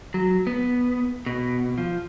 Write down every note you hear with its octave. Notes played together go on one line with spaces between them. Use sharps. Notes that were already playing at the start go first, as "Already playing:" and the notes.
F#3
B3
B2
F3